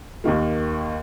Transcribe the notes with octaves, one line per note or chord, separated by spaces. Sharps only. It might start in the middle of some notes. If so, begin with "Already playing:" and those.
D#2 D#3 A#3